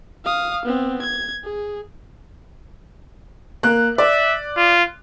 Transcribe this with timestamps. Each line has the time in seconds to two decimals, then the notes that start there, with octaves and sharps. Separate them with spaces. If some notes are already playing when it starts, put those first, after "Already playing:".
0.24 F5 D#6
0.65 B3 C4
1.02 G#6
1.44 G#4
3.63 A#3 F#6
3.98 D5 E5
4.57 F4